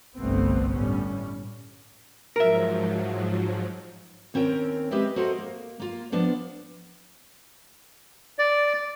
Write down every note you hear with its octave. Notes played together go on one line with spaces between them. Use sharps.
G1 C2 A3 B3 C4
A2 G3 C#4
G#2 F3 F#3 A#4 E5
D#2 C4 C#4 A#4 G5
G#3 C4 G4 B4 D#5 E5
F#4 A4 A#4 C5 D#5
A#3
A#3 F4
F3 B3 D4
D5